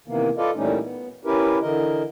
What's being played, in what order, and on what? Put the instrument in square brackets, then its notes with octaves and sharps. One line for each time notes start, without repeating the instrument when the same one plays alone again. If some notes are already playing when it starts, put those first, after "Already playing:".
[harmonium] C3 D#3 E3 A#3 B3
F4 A4 B4 D5 D#5 F5
A#2 E3 G3 A3 C#4 D#4
B3
C#4 E4 G4 A#4 B4
D3 E3 A#4 D#5